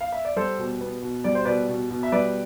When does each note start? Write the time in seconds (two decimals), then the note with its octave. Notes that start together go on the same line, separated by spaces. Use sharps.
0.01 F5
0.12 E5
0.25 D5
0.36 G3 A4 C5
0.59 B2
0.81 B3
1.02 B2
1.24 G3 D5
1.35 C5
1.45 B2 B4 D5
1.69 B2
1.90 B2
2.03 E5
2.12 G3 B4 D5